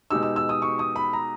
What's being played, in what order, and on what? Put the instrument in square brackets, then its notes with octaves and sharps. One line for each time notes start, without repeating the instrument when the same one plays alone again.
[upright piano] B2 G#3 D#4 G4 [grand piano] E6
[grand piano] E6
E6
D#6
C#6
D#6
B5
A#5